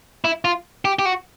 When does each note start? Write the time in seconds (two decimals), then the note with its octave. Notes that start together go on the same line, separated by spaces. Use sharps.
0.25 E4
0.45 F4
0.85 G4
0.99 G4
1.05 F#4